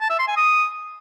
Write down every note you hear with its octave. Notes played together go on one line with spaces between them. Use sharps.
A5
E5
C6
G#5
D#6